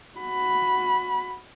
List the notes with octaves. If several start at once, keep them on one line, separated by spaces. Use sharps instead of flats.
F#4 B5